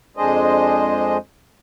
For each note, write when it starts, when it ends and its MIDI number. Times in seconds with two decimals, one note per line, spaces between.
0.17 1.17 41
0.17 1.17 56
0.17 1.17 62
0.17 1.17 68
0.17 1.17 72
0.17 1.17 75